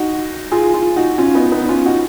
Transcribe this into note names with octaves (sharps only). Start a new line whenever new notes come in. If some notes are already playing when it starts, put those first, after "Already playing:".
Already playing: D#4 F#4
F4 G#4
F4 G#4
D#4 F#4
C#4 F4
B3 D#4
B3 D#4
D#4
C#4 F4
D#4 F#4